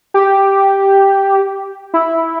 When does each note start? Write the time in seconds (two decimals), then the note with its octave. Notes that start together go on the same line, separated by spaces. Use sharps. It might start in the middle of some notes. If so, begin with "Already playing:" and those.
0.14 G4
1.94 E4